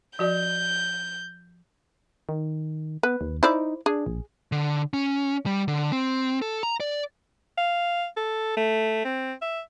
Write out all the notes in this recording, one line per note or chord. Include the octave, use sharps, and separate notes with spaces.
F3 F#4 D5 G6
D#3
B3 B4
D#2
D#4 E4 C5 D5
D4 G#4
A#1
D3
C#4
G3
D3
C4
A4
A#5
D5
F5
A4
A3
C4
E5